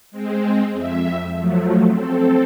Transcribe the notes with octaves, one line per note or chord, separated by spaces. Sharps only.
G#3 C4
F2 E5
F3 F#3 A3
C4 A4